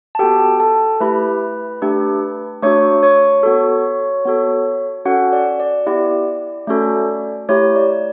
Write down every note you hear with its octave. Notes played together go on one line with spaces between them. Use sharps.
A5
B3 F#4 G4 A4 G5
A4 A5
A3 E4 G4 B4 B5
A3 D4 G4
A3 D4 F#4 C#5 C#6
C#5 C#6
B3 F#4 A4
B3 F#4 A4
C#4 F#4 A4 F#5
D5
D5
B3 E4 G4 D5
A3 C#4 F#4 A4
A3 E4 G4 C#5
D5